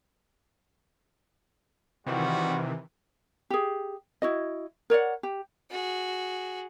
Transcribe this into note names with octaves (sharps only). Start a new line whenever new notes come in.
C3 D#3 E3 G3 F4 F#4
G4 G#4
E4 F#4 D#5
A#4 C#5 D5 F#5
G4
F#4 G#4